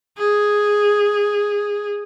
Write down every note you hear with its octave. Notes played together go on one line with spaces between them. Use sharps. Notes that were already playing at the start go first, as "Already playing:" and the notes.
G#4